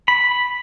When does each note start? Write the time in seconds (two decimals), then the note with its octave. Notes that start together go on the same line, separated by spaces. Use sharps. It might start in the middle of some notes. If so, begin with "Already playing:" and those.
0.08 B5